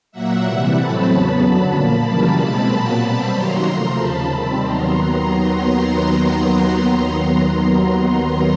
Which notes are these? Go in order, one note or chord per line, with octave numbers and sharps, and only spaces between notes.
A#2 F#3 A#3 E5 F#5
C3 E3 G3
A2 F#3 A3 C4 A5 B5
E2 C#3 F#3 B3
F#2 D3 F#3 A5 B5
A#2 F3 A#3
F#2 C#3 E3 G3 A#3 A5 B5
B2 G#3 C4
A#2 F#3 A#3 A5 B5
B2 G3 C4
F#2 D#3 F#3 A#3 A#5 C6
C3 F3 A3
D#2 C#3 F3 A5 B5
C3 D#3 G3 C4
D#2 D#3 F#3 B3 A#5 C6